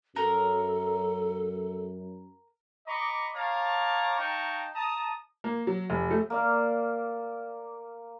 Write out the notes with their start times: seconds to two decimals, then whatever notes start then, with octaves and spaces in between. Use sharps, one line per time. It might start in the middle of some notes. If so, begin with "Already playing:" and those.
0.16 F#2 A4 A#4
2.87 D#5 A#5 B5 C#6 D6
3.34 C#5 F5 A5 A#5 C#6 D6
4.18 D#4 F5 G5 A5 A#5 C#6
4.75 A5 A#5 D#6
5.44 A#3
5.67 F#3
5.90 F1
6.11 A3
6.30 A#3 D5 F5